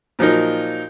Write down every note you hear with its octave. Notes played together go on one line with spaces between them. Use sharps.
A#2 F3 F#3 D#4 A#4